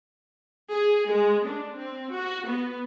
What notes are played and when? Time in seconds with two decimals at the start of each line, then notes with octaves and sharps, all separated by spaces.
0.71 G#4
1.11 G#3
1.46 D4
1.76 C4
2.14 F#4
2.48 B3